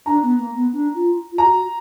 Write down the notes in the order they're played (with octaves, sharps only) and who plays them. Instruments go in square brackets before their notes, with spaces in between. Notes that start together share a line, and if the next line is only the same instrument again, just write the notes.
[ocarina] D4 [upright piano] A#5
[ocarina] B3
A#3
B3
D4
F4
F4
[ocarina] F#4 [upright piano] A#5